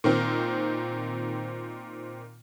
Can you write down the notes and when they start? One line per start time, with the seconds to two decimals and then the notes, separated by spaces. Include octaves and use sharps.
0.04 A#2 D#3 C4